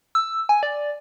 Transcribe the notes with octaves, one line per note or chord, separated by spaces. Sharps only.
E6
G#5
D5